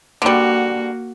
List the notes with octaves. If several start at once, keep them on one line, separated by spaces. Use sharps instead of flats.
D3 G3 A#3 F#4